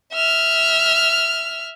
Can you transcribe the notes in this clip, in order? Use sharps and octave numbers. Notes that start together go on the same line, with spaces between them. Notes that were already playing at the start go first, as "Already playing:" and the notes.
E5 F6